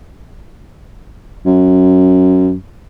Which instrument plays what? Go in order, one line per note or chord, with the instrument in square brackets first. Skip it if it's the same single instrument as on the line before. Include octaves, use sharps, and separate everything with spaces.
[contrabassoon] F#2